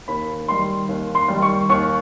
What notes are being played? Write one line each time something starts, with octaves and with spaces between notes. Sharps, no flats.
D#2 B5
D#3 G3 C6
D#2
C6
D#3 G3
C#6
D#2 C#6